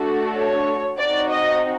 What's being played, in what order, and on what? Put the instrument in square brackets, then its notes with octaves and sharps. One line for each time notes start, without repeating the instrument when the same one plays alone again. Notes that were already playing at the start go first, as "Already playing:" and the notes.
Already playing: [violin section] A3 D4 F#4 A4
C#5
C4 D#4 F#4 D5
D#5